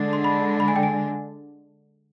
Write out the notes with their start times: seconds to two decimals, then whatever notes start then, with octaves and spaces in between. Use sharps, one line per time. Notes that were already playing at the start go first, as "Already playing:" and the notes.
Already playing: D3 G#3 D4
0.13 C6
0.24 B5
0.60 B5
0.68 G#5
0.76 G5
0.83 G#5